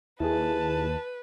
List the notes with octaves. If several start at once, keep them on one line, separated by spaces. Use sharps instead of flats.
D#2 E4 G#4 B4 A5